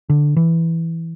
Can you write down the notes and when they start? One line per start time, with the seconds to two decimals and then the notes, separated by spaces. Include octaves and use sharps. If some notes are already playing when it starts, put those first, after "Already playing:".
0.10 D3
0.37 E3